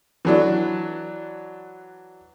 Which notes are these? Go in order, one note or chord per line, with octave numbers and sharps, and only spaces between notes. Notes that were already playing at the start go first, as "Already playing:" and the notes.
E3 F#3 D4